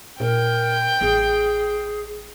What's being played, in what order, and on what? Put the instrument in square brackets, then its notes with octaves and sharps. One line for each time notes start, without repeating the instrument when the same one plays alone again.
[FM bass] A#2 [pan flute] A#4 [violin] G5
[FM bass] A1 [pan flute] G#4